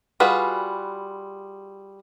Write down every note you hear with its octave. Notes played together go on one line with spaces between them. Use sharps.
G3 F4 F#4 G#4 B4